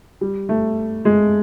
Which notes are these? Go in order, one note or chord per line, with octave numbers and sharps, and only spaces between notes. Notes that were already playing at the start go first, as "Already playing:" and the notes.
G3
A3
G#3